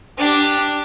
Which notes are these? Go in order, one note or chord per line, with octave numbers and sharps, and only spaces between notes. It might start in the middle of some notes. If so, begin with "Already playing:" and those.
D4 G4